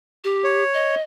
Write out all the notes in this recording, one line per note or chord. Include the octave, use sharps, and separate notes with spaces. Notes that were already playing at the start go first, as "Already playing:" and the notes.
G4
C#5
D#5